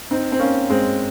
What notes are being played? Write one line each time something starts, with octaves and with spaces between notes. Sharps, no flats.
C4 D#4
C4
A#3 C#4
G#3 C4